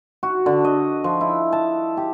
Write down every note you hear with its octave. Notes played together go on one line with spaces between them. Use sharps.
F#4
D3
D#5
F3
E4
A5
G4